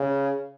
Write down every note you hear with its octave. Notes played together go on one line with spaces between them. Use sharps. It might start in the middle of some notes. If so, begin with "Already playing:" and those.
Already playing: C#3